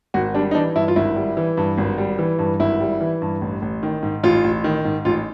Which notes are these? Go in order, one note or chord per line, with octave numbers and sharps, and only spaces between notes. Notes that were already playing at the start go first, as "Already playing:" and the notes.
G#1 F#4
G3 D4
D#4
E3 D4
G2 E4
F4
G#1 E4
G3
E3
G2
G#1
G3
E3
G2
G#1 E4
G3
E3
G2
A1
A1
D#3
G#2
A1 F4
A1
D#3
G#2
A1 F4